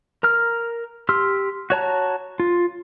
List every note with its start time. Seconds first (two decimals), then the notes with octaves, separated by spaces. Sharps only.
0.23 A#4 A#5 F6
1.09 G4 C6 E6 F6
1.70 F#4 C#5 A5 A#5
2.40 F4